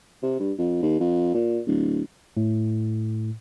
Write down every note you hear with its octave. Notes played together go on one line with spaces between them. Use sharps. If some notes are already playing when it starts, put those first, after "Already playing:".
C3
G2
F2
D#2
F2
A#2
D1
A2